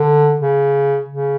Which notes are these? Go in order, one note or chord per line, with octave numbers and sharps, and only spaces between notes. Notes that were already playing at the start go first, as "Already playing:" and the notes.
Already playing: D3
C#3
C#3